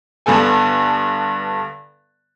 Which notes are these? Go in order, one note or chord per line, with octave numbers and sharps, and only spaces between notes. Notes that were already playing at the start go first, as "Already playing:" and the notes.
G2 D3 B3 A4 G#5